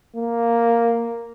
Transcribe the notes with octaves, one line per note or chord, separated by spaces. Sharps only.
A#3